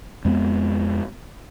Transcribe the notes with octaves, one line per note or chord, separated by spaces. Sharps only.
F2 G#3 A#3 B3